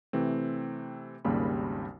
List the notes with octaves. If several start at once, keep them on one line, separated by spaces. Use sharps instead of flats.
C3 E3 A3 C4
G#1 D#2 C#3 G3 A#3 B5